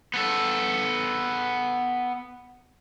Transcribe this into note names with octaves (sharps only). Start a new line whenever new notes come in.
B3 A4